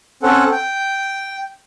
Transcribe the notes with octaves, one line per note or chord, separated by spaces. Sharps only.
C4 C#4 A4 F#5
G5